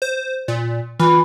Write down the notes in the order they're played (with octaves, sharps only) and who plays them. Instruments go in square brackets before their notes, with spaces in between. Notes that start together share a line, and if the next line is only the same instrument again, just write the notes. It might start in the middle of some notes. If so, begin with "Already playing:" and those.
[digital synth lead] C5
A#2
[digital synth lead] E3 [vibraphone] F4 B5